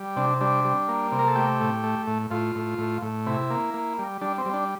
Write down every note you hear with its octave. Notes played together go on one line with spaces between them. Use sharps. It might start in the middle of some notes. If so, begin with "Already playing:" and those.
Already playing: G3
C3 D4
G3 D4
G3
A#3
C3
A#4
A4
A3 G4
A2
A3
A2
A2 F4
A2
A2
A2
C3 E4
A#3
A#3
G3
G3 D4
C4
G3
D4